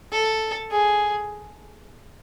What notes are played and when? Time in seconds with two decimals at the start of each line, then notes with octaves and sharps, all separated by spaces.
0.12 A4
0.70 G#4